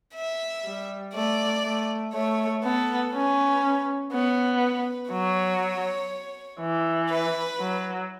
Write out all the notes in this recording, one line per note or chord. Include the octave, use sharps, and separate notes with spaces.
E5
G3
A3 D5
A3
A3 C#5
B3 A4
C#4 B4
B3 C#5
B4
F#3 C#5
E3
B4
F#3